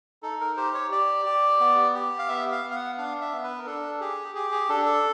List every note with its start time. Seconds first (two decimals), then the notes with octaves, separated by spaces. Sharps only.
0.23 D#4 A4
0.41 A#4
0.57 G4 C5
0.74 C#5
0.92 G4 D5
1.26 G4
1.60 B3
1.95 G4
2.19 F5
2.29 B3 E5
2.52 F5
2.64 B3
2.71 F5
2.75 F#5
2.98 D4 F5
3.21 E5
3.32 B3
3.44 B4
3.59 A#4
3.66 D4 A4
4.00 G4 G#4
4.34 G4 G#4
4.52 G#4
4.69 D4 A4
4.86 A4